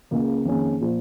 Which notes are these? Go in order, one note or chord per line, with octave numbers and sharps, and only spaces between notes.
C#2 C#3 A#3
F2 D#3 A#3 C#4 G#4
A#2 F3